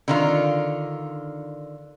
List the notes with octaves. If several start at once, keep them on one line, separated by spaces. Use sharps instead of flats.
D3 D#3 F4